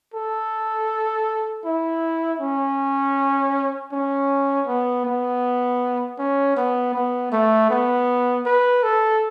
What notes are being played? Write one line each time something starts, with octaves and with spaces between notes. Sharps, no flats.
A4
E4
C#4
C#4
B3
B3
C#4
B3
B3
A3
B3
B4
A4